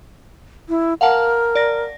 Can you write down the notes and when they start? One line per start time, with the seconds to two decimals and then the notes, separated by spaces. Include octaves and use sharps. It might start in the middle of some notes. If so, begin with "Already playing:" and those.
0.69 E4
1.01 A#4 F5 F#5 A5
1.55 D5 A#6